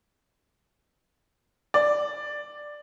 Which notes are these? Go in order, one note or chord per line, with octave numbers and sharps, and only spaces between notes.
D5